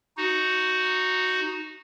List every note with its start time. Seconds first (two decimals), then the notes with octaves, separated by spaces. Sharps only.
0.17 D#4 F#4